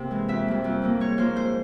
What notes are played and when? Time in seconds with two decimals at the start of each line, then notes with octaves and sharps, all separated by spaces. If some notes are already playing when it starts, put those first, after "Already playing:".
Already playing: C3 A#3
0.11 E3 G#3
0.28 F2 E5
0.46 C3 G3 A#3
0.64 F2
0.82 C3 G3 A#3
1.00 G#2 C#5
1.18 F3 A#3 C5
1.36 G#2 C5